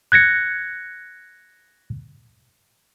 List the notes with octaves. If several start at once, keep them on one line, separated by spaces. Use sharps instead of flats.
F#6 G#6 A#6 C#7